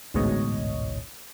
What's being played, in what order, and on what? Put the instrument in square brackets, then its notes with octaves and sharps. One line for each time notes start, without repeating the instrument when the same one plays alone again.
[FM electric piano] A1 D2 G#2 B2 C#5 D#5